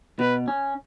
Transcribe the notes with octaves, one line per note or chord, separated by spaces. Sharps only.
B2 B4
C#4